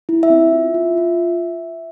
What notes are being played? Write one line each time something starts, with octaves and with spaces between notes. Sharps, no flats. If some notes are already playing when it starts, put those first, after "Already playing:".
E4
E5
C4
F4
F4
F4